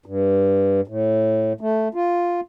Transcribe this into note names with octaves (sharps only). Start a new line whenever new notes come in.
G2
A2
A3
F4